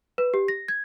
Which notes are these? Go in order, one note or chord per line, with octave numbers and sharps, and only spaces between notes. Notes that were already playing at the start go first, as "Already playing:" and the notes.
B4
G4
A#6
G#6